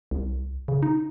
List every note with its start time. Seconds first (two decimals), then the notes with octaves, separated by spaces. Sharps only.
0.11 C2
0.68 C#3
0.83 D#4